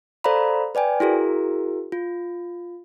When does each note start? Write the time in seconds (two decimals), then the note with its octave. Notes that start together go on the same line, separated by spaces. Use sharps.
0.24 A4 C5 D5 F5 A#5 B5
0.75 B4 D5 G5 G#5
1.00 E4 F#4 G#4 A#4
1.92 F4